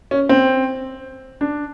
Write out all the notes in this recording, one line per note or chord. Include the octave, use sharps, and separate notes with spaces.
C#4
C4
D4